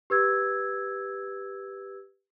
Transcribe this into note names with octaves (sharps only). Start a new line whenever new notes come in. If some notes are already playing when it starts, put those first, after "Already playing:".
G4 B4 E6 G#6